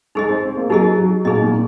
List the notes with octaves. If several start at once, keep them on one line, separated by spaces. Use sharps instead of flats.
G#3 D#4 G#4 D#5
C4
C4
A#3
F#3 D#4 G#4 D#5
F#3
A#2 D#4 G#4 D#5
A#2